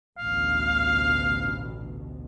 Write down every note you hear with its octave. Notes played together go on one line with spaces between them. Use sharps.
A1 D2 B2 F5